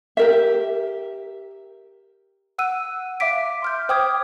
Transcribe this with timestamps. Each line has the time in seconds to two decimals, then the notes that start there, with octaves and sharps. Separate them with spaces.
0.17 G4 A#4 E5
2.58 F#5 E6 F#6 D#7
3.20 E5 F5 D6 B6 D7
3.62 C6 F6 G6
3.89 C5 G5 D6 D#6 F6 G#6